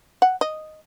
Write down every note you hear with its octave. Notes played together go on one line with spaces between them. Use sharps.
F#5
D#5